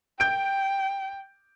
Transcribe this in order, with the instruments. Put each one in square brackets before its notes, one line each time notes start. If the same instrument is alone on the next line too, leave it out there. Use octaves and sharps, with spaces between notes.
[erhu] G5 [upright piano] G6 D7